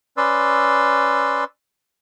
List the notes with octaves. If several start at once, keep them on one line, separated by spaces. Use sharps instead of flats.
C#4 B4 D5 C6 E6